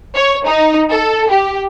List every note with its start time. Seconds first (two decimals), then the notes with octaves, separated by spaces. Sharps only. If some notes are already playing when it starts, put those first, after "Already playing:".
0.16 C#5
0.47 D#4
0.92 A4
1.30 G4